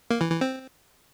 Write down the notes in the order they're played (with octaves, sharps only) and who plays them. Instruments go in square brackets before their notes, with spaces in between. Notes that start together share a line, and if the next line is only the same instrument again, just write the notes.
[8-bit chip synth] A#3
E3
E3
C4